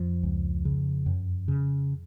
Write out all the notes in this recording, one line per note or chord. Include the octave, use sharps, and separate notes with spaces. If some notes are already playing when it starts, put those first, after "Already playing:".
Already playing: F2 F3
C#2
C#3
F#2
C#3